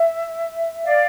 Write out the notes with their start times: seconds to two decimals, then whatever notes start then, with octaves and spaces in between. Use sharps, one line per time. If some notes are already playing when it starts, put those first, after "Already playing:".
Already playing: E5
0.84 D5 F5